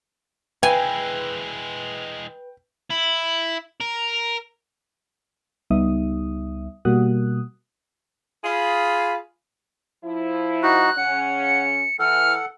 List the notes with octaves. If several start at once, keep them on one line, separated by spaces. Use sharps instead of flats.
E3 G#3 B4 G5 G#5
E4
A#4
C#2 G3 B3 D#4 E5 D#6
B2 G3 A#3 F#4 D#6 F#6
F4 G#4 B5
F3 E4
D#4 F#4 F#6
C#3 C#4 F#5
C#7
E3 A4 F#5 F6